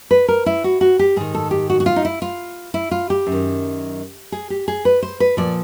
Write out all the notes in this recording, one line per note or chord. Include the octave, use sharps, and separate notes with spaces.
B4
A#4
E4
F#4
F#4
G4
G#2 D#3 G#4
A4
G4
F#4
F#4
F4
D#4
E4
F4
E4
F4
G4
F#2
D#3
G#4
G4
G#4
B4
C5
B4
A#2 F3 D5